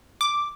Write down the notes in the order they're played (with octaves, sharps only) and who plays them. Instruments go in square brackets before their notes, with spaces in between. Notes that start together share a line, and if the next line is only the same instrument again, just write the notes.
[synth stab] D6